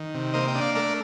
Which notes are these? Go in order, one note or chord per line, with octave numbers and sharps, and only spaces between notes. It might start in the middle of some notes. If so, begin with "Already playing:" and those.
Already playing: D#3
C3
A#3 C5 D#5
D#5 G5
D4
D5 F5
A3 A#4 D5